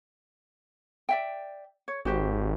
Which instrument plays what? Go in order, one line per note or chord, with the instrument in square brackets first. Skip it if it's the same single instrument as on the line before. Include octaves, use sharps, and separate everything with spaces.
[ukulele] D5 E5 G5
C#5
[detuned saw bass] G#1 [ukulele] F#4 G4 C5